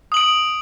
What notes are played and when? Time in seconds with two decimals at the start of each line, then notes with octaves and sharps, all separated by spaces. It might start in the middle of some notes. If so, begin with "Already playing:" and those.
0.12 D#6
0.14 F#7
0.17 D7